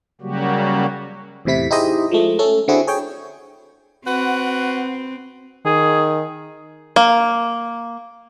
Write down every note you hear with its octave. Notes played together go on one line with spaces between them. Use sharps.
C#3 F#3 G3 A#3 F#4 G4
E2 A2 C3 E4 B6
D#4 E4 G4 G#4 C5 D#5
F3 G#3 A3
A3 C#4 A4
D3 C4 E4 F#4 G#4
G#4 C#5 G5
C4 F#4 B4 F#5
D#3 G#4
A#3